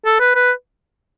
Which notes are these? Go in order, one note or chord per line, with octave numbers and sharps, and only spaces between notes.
A4
B4
B4